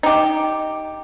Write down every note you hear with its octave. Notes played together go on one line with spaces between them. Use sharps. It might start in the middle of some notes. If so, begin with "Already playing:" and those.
D#4 G4